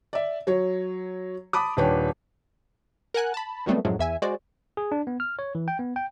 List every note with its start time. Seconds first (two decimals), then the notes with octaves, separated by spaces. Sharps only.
0.13 D5 E5
0.47 F#3 C#5
1.53 A5 B5 D6 D#6
1.77 D#1 D4 B4 C#5 G5
3.14 A#4 F#5 G#5 F#6
3.34 A5 B5
3.66 D#3 F#3 G3 A3 B3 C4
3.85 F#2 A2 F3 F#3 G#3
3.99 E2 E5 G#5
4.22 G#3 F#4 C5 D5
4.77 G#4
4.92 D4
5.07 B3
5.20 F6
5.39 C#5
5.55 E3
5.68 G5
5.79 B3
5.96 G5